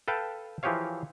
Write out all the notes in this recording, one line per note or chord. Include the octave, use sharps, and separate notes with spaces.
A4 B4 F5 G5 A5
E3 F3 G4 G#4 C#5 F5